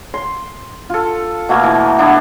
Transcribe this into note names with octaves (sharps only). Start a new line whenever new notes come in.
C6
F4 A4
B2 A3 A#3 F4
E3
B3 D4 E4 B4